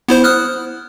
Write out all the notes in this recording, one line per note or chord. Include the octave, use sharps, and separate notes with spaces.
B3 E4 C5
D#6 F6 F#6